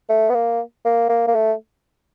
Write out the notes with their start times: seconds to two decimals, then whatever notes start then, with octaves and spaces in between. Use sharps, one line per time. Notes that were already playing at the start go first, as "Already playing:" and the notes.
0.09 A3
0.30 B3
0.34 A#3
0.85 A#3
1.10 A#3
1.28 A#3
1.35 A3